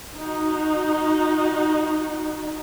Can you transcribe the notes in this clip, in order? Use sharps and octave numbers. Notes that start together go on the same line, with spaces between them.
D#4 F#4